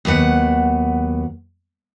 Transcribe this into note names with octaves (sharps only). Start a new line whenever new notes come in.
D#2 F#3 B3 F#5